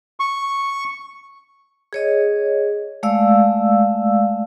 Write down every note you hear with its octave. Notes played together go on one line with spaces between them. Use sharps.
C#6
G#4 C#5 D#5
G#3 A3 D5 F5 E6